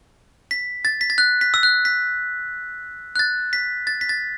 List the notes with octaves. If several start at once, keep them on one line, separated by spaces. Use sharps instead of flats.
B6
A6
B6
A6
F#6
B6
E6
F#6
B6
F#6
A6
B6
A6
B6
A6